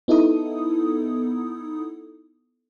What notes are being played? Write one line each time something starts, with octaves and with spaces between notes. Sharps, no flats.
B3 D#4 E4 A4 D#6